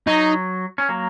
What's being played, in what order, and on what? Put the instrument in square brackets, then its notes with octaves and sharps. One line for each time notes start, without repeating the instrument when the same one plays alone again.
[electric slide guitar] F#3 [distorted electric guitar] D#4
[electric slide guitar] C#4
F#3 A#3